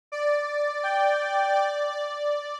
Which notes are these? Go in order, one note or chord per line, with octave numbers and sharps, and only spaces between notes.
D5
G5
D5
D5